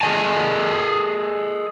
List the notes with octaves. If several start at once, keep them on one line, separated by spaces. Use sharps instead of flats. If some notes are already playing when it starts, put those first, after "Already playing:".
G#4 A4 C#5 D#5 G#5 A5